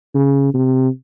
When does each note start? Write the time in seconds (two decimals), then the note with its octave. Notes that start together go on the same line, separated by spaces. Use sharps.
0.15 C#3
0.54 C3